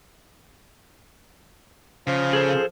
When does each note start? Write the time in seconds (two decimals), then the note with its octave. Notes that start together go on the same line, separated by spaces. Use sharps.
2.07 C#3 F3
2.33 G#4 A4 C5